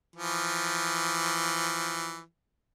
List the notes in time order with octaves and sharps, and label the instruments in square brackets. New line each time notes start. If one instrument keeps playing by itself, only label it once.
[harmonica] E3 F3